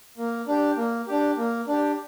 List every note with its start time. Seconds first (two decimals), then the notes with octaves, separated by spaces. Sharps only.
0.18 A#3
0.47 D4 G4
0.77 A#3
1.07 D4 G4
1.37 A#3
1.68 D4 G4